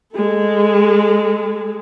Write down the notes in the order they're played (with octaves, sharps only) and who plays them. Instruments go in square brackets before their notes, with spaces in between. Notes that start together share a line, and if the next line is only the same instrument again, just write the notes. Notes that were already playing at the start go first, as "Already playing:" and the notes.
[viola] G#3 A4